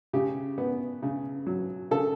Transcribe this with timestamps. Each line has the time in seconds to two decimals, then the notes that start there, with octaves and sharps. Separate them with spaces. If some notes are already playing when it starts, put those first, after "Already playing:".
0.13 C#3 G4
0.58 B3
1.03 C#3
1.47 F#3
1.91 C#3 A4